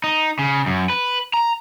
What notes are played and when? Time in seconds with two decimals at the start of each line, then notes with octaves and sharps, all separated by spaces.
0.04 D#4
0.39 C#3
0.66 F#2
0.90 B4
1.34 A#5